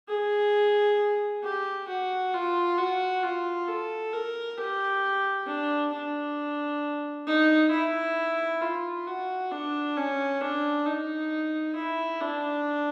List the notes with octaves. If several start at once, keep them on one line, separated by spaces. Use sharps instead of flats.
G#4
G4
F#4
F4
F#4
F4
A4
A#4
G4
D4
D4
D#4
E4
F4
F#4
D4
C#4
D4
D#4
E4
D4